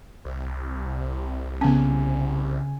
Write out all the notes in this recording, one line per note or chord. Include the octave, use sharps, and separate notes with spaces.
C2
C#3 B3 C#4 G#5